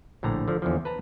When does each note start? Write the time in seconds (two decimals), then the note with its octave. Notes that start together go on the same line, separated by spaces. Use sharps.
0.23 A#1 A2 D3 A#5
0.48 D3 F3
0.62 E2 D3 F3
0.85 B4 A5 A#5